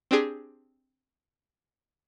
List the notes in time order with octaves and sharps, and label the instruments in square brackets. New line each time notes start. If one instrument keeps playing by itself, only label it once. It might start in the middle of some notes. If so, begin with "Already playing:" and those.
[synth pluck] C4 D4 G4 G#4